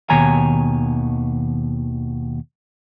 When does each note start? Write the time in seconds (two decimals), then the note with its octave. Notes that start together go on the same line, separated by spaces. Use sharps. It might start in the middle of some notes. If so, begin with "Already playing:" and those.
0.10 D#2 B2 D#3 C#5 G#5 A#5